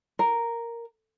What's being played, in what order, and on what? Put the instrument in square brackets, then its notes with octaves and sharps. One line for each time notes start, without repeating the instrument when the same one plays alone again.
[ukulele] A#4